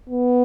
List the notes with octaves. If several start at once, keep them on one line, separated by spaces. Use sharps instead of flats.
B3